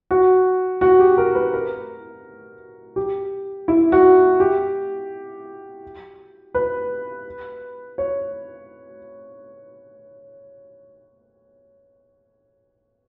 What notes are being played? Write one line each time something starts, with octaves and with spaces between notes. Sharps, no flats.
F#4
F#4
G4
A#4
B4
A#4
G4
E4
F#4
G4
B4
C#5